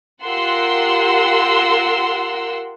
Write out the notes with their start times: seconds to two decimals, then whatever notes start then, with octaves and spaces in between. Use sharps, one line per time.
0.24 F4 G4 A#4 F#5 C6 E6